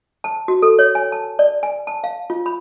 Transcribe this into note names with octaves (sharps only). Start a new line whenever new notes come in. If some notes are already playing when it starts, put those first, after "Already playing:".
A5
F#4
A4
C#5
G#5
A5
D5
G#5
A5
F5
F4
B5